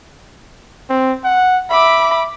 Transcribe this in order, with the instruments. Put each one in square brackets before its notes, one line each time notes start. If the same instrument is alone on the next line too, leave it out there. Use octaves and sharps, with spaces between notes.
[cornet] C4
F#5
[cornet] E5 [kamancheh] B5 D6